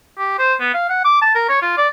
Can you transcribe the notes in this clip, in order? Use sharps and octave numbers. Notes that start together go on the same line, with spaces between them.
G4
C5
B3
F5
F#5
D6
A5
A#4
C#5
F4
D5